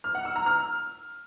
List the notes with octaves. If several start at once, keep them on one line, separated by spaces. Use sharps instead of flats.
F6
F#5
E6
A#5
F6